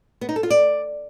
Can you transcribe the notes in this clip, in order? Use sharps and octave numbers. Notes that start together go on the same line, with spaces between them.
B3
D#4
A4
F4
D5